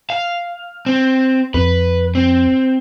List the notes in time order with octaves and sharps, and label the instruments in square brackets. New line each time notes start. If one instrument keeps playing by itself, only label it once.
[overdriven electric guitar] F5
C4
[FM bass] F2 [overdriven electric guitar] B4
[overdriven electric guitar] C4